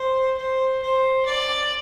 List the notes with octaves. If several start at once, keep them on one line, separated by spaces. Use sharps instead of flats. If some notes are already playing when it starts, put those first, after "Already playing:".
Already playing: C5
C5
C5
D5